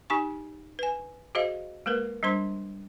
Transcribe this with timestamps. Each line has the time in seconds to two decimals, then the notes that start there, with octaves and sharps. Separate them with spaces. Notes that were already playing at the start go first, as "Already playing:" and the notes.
0.10 D#4 G4 G#5 C#6
0.79 B4 G#5
1.35 F#4 G#4 C5 D#5 F5
1.86 G#3 A#3 A#4 B4
2.23 G3 D4 C5 C6